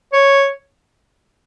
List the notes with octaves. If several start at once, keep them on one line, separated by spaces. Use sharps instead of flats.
C#5